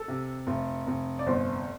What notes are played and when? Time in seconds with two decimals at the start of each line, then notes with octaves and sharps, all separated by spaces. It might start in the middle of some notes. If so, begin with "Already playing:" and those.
Already playing: A4
0.08 C3
0.47 F1
0.87 F1
1.19 D5
1.26 G1 C5